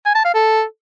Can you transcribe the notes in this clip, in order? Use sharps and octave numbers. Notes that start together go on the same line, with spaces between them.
G#5
A5
F5
A4